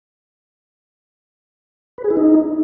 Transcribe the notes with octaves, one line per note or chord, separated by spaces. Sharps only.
B4
G#4
E4
D#4